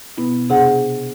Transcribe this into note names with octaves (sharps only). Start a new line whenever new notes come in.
B2 B3 E4
C3 D4 G#4 F#5